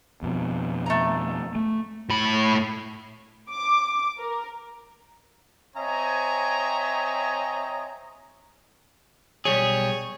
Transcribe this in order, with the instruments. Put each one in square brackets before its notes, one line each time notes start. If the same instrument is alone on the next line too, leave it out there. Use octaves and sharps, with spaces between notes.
[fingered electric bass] F2 B2
[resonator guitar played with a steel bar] A3 A#5
[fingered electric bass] A3
[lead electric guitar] A2 B5
[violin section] D6
A#4
[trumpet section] C4 C#5 D#5 E5 G#5 A#5
[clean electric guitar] B1 G3 G#4 [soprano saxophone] C#5